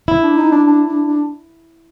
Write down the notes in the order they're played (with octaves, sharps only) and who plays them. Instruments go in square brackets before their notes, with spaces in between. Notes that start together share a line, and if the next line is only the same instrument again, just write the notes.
[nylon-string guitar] E4
[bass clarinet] D4
D#4
D4
D4
D4
D4